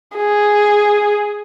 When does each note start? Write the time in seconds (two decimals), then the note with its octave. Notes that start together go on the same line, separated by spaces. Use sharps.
0.17 G#4